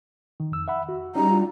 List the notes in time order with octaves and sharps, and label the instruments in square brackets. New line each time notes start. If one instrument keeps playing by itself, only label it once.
[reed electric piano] D#3
F2 E6
E5 F#5 B5
F#4
[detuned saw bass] G3 [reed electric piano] C#4 D#4 [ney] A#5
[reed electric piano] D4 F4